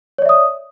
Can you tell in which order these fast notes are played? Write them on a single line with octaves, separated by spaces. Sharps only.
C#5 D5 E5 D#6